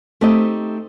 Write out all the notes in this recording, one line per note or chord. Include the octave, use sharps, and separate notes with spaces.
A3 C4 D#4 G4 D#5